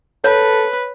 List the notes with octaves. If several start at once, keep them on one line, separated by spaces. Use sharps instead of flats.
A4 B4 C#5